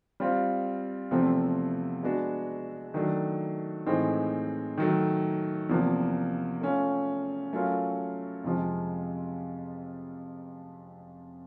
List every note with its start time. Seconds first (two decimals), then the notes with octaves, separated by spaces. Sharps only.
0.20 G3 C4 F4
1.11 E2 C3 F3 A3 C4
2.03 G#3 B3 D4 F#4
2.94 D#3 F#3 A3 D4
3.86 A2 E3 G#3 C4 D#4
4.78 D#3 F#3 A3
5.69 E2 C3 F3 A#3
6.61 A3 C#4 F4
7.53 F#3 A3 C#4 F4 A#4
8.44 F2 C3 F3 G#3